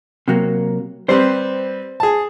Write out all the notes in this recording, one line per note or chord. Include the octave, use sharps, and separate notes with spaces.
C3 F#3 A#3
G3 C4 B4 C5
G#4 A5